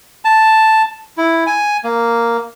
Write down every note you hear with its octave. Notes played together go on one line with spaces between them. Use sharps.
A5
E4
G#5
A#3